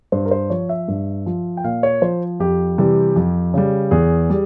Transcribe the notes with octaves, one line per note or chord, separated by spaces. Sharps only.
G2 C5
A#4
C5
F3 C#5
E5
G2
F3
G5
A#2 F5
C#5
F3 C5
F2 G4
C3 E3 G3
F2
C#3 G3
E2 G#4
G3